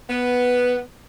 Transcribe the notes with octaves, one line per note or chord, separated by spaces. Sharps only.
B3